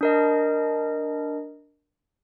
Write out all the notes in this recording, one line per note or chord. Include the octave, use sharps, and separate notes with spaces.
D4 A#4 D#5